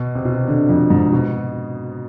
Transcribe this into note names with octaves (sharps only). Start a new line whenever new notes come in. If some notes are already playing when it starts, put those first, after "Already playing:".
Already playing: B2
C3
B2
C3
D3
F2
G#2
B2